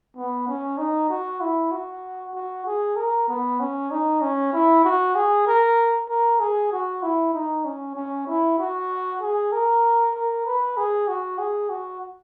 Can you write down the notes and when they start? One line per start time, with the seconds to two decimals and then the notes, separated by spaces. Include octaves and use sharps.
0.16 B3
0.48 C#4
0.78 D#4
1.10 F#4
1.41 E4
1.72 F#4
2.34 F#4
2.66 G#4
2.96 A#4
3.29 B3
3.60 C#4
3.91 D#4
4.21 C#4
4.53 E4
4.85 F#4
5.15 G#4
5.47 A#4
6.09 A#4
6.40 G#4
6.72 F#4
7.03 E4
7.34 D#4
7.65 C#4
7.95 C#4
8.27 E4
8.58 F#4
9.21 G#4
9.52 A#4
10.14 A#4
10.46 B4
10.77 G#4
11.08 F#4
11.38 G#4
11.70 F#4